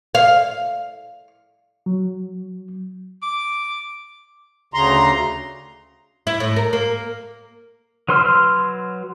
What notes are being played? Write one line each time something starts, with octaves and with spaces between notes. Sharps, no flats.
F5
F#3
D6
D2 C#3 A#5 C6
E4
A2
A#4
A#3
F#3 B4 C6 E6 F6